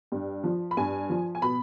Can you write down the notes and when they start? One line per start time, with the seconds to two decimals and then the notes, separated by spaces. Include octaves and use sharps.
0.12 G2
0.44 F3
0.71 B5
0.77 G2 G#5
1.10 F3
1.35 G#5
1.42 B2 B5